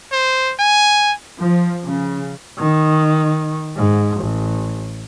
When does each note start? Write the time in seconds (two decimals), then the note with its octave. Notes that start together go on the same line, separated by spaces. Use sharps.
0.12 C5
0.59 G#5
1.40 F3
1.84 C#3
2.59 D#3
3.77 G#2
4.17 A1